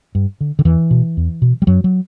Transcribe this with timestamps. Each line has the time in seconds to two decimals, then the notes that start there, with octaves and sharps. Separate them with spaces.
0.15 G2
0.41 D3
0.59 D3
0.65 E2 E3
0.91 B2
1.17 E2
1.42 B2
1.62 G3
1.67 F#2 F#3
1.84 F#3